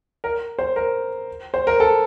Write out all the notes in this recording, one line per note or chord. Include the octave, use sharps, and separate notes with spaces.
A#4
C5
A#4
C5
A#4
A4